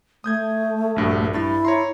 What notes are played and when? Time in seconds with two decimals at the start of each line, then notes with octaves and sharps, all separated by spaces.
0.24 A3 D#6 G6 G#6
0.96 A#1 G2 F#4
1.34 G2 E4 A6
1.65 C#5 A#5 C6